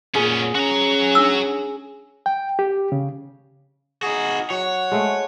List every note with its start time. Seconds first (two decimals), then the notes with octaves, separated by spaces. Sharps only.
0.15 A#2 B3 C#4 G#4
0.55 C#4 F#4 A#5
1.15 D4 E6
2.26 G5
2.59 G4
2.92 C#3
4.03 D#4 F#4 G#4
4.50 F#3 C#5 F#5
4.92 G#3 A3 C5